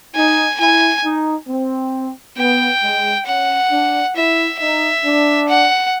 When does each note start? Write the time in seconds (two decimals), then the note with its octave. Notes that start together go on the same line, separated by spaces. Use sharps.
0.15 D#4 G#5
0.59 E4 G#5
1.04 D#4
1.48 C4
2.37 B3 G5
2.82 G#3
3.26 C#4 F#5
3.71 D4
4.16 E4 E5
4.59 D#4 E5
5.04 D4
5.49 F#5